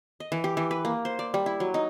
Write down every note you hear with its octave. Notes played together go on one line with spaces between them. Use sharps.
D#5
E3
G4
E3
B4
A#3
C5
D5
G3
E4
F#3
D#4